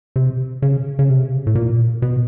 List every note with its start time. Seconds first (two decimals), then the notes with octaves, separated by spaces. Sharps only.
0.16 C3
0.62 C#3
0.99 C#3
1.10 C3
1.47 A2
1.55 A#2
2.02 B2